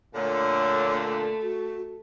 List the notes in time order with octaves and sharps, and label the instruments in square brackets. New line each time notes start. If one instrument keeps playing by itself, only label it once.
[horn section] A#2 D3 [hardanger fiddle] A3 [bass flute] C#5
[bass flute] F#4